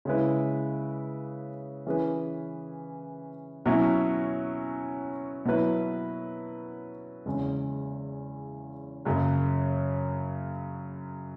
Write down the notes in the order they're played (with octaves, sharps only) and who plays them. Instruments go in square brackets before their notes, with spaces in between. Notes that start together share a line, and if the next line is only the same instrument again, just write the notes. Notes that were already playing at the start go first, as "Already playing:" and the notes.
[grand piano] C#3 G#3 E4 B4
E3 C#4 G#4 B4
B2 F#3 C#4 E4
B2 F#3 E4 B4
E2 C#3 G#3 C#4
F#2 C#3 F#3